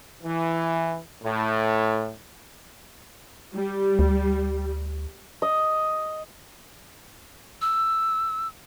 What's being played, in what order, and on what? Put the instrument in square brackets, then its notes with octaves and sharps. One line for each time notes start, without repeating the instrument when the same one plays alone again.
[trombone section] E3
A2
[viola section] G3
[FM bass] D2
[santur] D#5
[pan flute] E6